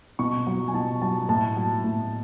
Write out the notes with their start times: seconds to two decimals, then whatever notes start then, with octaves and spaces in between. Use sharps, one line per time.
0.19 B2 C#6
0.47 F#3
0.68 G#5
0.74 B2 A5
1.01 F#3 A5
1.29 A2 A5
1.56 F#3
1.84 A2